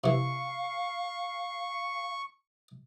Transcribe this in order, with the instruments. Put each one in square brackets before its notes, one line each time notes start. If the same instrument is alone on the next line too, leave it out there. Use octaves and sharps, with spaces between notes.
[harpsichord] C3 E3 [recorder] F5 [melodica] C#6